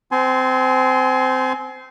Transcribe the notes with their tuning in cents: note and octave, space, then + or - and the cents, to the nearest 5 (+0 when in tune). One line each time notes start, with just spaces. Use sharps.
C4 -20 G#5 +30 C6 +0